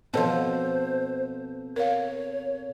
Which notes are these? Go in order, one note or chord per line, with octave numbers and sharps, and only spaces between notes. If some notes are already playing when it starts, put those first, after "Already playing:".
B2 F3 C4 A4 C5 C#5 A5
A#4 C#5 F5